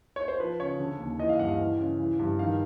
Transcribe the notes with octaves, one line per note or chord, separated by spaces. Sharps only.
C#5
C5
F3 B4
C#3 C#5
D3
D#2
E3 D#5
F5
G2 F#5
F5
E3
C#3
E3
G2
D#3 F5